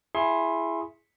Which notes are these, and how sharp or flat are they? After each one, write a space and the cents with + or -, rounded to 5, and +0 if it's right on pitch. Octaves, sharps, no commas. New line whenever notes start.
E4 +15 G#4 +0 C6 +30